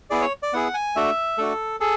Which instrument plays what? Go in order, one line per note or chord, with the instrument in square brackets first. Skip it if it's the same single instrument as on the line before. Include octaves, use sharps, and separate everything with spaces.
[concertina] B3 E4 G#4 D5
C#5
D5
B3 E4 G#4 F#5
G#5
A3 D4 F#4 E5
A3 D4 F#4 A4
G#4 A4